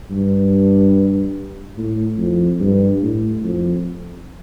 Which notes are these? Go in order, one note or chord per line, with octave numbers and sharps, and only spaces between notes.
G2
A2
F2
G2
A2
F2